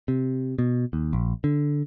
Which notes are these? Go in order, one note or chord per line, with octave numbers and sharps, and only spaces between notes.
C3
B2
D#2
A#1
D3